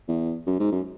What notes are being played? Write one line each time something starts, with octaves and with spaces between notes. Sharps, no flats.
E2
F#2
G#2
F#2